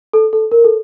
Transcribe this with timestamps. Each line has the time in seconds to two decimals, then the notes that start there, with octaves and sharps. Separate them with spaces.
0.13 A4
0.33 A4
0.52 A#4
0.64 A4